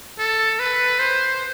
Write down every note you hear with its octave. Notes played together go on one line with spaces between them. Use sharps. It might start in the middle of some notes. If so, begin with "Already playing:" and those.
A4
B4
C5